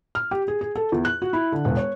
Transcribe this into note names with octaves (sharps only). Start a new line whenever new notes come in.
F6
G4
G#4
G#4
A4
E2
F#6
F#4
E4
D3
E1
C#5